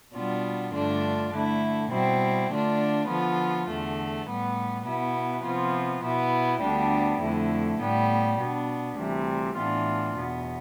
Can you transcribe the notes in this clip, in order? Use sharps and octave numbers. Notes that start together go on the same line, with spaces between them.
B2 G3 B3 D4 F4
G2 D3 A3 D4 F4
D3 A3 E4
B2 G3 C4 E4
D3 A3 D4 F4
D3 F3 B3 F4
E2 D3 A3
A2 G3 B3
B2 B3 E4
C3 F3 B3 F4
B2 B3 E4
D2 D3 G3 B3 D4
F2 D3 A3 E4
A2 G3 B3
B2 B3 D4
D2 C3 E3 G3
A2 E3 B3 D4 F4
E2 B2 B3